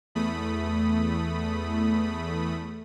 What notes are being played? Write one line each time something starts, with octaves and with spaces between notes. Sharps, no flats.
E2 A3 B5 D#6